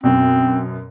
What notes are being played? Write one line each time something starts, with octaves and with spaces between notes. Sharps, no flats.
F#2 B2 C4